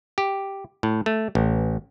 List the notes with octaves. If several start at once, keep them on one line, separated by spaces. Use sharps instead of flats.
G4
A2
A3
A1